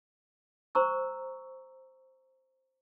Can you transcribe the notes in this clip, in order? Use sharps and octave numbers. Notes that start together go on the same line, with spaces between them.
C5 A#5 C#6 E6